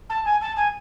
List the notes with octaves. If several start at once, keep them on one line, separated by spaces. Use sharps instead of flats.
A5
G#5
A5
G#5